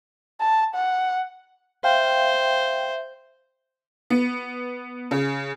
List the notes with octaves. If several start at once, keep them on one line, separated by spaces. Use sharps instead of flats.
A5
F#5
C5 E5 F5 G5
B3
C#3